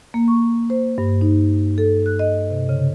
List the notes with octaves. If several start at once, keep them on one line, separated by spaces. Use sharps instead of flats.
A#3
C#6
C5
G2
D#4
A4
F#6
D#5
C3
C#3